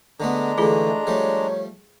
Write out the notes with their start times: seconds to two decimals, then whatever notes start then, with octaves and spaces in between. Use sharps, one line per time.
0.20 D3 G#3 A3 B3 D4 A#5
0.58 D3 E3 A3 F4 G#4
1.07 F3 G3 A3 C#5